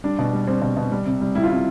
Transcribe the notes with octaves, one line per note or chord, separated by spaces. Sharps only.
G3 D4
B2
G3
G3 C4
B2 C4
B2
G3
C3
G3
G3 E4
F4
C3 E4